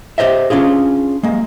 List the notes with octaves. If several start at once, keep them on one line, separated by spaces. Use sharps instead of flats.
G4 G#4 C5 D#5 E5
C#4 D4 F4 G#4
G#3 A#3